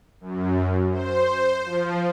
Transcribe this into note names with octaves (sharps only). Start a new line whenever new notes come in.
F#2
C5
F3